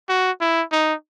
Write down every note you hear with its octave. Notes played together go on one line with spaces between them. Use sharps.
F#4
E4
D#4